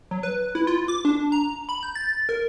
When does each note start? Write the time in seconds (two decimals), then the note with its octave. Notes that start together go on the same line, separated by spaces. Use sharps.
0.11 F#3
0.23 B4
0.55 E4
0.67 F4
0.88 D6
1.05 D4
1.32 A#5
1.69 B5
1.83 G6
1.95 A6
2.29 A#4